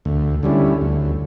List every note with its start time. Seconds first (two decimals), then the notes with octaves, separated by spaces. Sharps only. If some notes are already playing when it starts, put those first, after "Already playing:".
0.05 D2
0.43 D3 G3 C#4 E4
0.81 D2